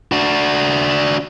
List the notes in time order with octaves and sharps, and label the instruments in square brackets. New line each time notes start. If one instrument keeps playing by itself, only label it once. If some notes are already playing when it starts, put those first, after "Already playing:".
[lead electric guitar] D4 F#4